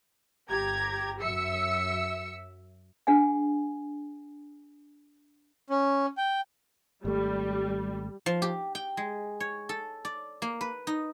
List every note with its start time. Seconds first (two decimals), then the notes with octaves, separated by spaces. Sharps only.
0.51 G1 G4 A#5 G#6
1.22 F#2 E5 E6 C#7
3.07 D4 G#4 F#5 G#5
5.70 C#4
6.17 G5
7.05 G#1 G3 A3
8.26 F3
8.42 G4
8.75 G5
8.97 G#3
9.40 C#5
9.69 A4
10.05 D5
10.42 A#3
10.61 B4
10.87 D#4